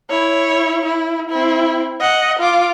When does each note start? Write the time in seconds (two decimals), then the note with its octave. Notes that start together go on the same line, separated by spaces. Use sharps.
0.10 E4 C#5
0.85 E4
1.29 C4 E4
2.00 D#5 F#5
2.39 F4 D6